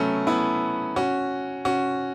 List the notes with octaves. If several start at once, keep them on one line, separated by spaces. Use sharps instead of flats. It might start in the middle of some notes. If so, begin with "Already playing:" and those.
Already playing: F#3 A3 B3 C#4
B3 E4
C#4 F#4
C#4 F#4